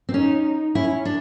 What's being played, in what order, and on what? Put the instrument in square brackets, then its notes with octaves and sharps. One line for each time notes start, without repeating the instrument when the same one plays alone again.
[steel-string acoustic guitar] C4
[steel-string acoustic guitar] C#4 [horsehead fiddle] D#4
[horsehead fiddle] C#4 [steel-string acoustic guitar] E4
[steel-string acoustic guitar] D4